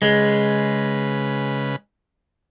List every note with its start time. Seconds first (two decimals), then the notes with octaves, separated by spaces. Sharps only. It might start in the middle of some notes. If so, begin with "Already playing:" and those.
0.02 C#3 G#3 B4